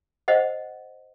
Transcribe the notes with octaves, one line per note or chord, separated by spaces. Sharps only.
C5 D#5 F#5